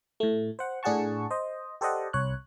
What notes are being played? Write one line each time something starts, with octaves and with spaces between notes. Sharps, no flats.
A2 A3
C5 F#5
A2 D4 G#4 F#5 A5 C#6
C5 D#5
G4 A4 C5 D5 D#5 F#5
C2 C#5 F#6